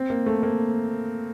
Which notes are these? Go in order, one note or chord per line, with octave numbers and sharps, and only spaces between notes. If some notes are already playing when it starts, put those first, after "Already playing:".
Already playing: C4
A#3
A3
A#3